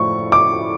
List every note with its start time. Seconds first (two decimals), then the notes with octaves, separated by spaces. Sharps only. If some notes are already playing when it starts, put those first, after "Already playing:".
Already playing: A2 F3 C#6
0.32 D6